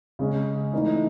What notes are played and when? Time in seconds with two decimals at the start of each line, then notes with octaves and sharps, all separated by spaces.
0.19 C#3 G#3 C#4
0.73 E3 A3 D#4